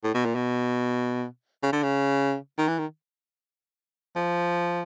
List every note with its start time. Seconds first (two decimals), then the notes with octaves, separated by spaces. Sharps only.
0.04 A2
0.15 B2
0.25 A#2
0.36 B2
1.63 C#3
1.73 D3
1.83 C#3
2.58 D#3
2.68 E3
2.79 D#3
4.16 F3